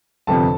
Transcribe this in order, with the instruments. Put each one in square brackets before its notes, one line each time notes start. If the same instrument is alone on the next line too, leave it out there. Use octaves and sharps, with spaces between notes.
[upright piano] G1 F2 C3 A4 A5